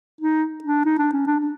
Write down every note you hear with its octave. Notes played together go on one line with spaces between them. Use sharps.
D#4
D4
D#4
D4
C#4
D4
D4